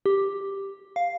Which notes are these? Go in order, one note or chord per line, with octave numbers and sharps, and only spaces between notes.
G4
F5